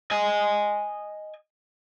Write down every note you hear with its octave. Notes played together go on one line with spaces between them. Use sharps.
D#5 G#5